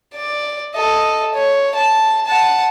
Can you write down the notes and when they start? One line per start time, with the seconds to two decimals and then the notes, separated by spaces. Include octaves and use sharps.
0.15 D5
0.75 A4 D#5
1.34 C#5
1.75 A5
2.26 F#5 A5